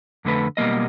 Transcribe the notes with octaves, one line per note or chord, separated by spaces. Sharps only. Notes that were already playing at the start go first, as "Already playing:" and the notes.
F2 D3 A3 B4
B1 B2 G3 A#3 D#5